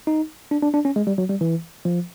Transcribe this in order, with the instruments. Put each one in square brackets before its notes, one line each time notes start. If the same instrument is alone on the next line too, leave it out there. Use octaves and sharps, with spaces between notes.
[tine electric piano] D#4
D4
D4
D4
C#4
G#3
G3
F#3
G3
E3
F3